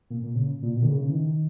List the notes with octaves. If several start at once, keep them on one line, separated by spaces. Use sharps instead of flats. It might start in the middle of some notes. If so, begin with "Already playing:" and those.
A#2
A#2
C#3
A#2
B2
D#3
C#3
C#3
E3
D#3